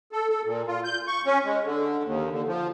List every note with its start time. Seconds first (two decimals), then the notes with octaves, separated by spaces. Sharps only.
0.12 A4
0.29 A4
0.45 A#2
0.67 F4
0.84 G6
1.08 C#6
1.26 C#4
1.45 G#3
1.64 D3
2.04 D#2
2.31 D3
2.47 F3